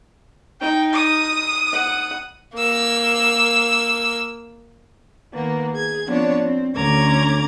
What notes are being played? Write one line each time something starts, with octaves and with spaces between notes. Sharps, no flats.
D#4 G5
D#6
F#5
A#3 E6
D#3 A#3 B3
G#4 G#6
F3 B3 C4 D4 C#5 D5
C4
D2 D3 C#4 A#5 D6 G#6